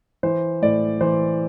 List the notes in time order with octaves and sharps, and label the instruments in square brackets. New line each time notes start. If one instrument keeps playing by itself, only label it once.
[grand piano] E3 C5
A2 D5
E3 C5